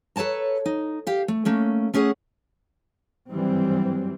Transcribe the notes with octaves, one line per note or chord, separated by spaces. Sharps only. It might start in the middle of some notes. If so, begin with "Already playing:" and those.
A4 B4 C#5 A5 A#5
D#4
G4 F5
A3
A3 A#3 C#4
A3 C#4 G#4 F#5
G#1 G2 E3 F#3 G3 C4